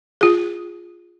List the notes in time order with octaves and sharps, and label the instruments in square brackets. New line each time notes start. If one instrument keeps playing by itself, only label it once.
[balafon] F4 G#4